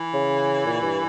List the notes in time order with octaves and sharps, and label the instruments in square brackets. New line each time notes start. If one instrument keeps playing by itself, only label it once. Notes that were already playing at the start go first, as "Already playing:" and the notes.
Already playing: [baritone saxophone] E3
[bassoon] C#3
A#2
G2